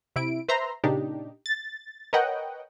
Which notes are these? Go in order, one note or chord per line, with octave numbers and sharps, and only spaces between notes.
C3 E4 D7
B4 C5 E5 A#5 C6
A#2 C#3 D4 D#4 G4
A6
A#4 B4 C#5 D#5 F#5 G5